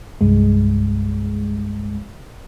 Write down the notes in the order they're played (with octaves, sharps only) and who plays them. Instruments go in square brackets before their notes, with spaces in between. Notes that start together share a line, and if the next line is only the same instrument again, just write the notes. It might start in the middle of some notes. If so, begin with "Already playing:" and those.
[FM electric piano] C2 G2 G#3